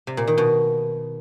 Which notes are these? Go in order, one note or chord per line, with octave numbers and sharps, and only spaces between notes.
C3
A#2
D#3
B2